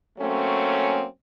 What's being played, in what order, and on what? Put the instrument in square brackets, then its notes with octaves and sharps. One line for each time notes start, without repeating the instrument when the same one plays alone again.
[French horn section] F#3 A3 A#3 C4 C#4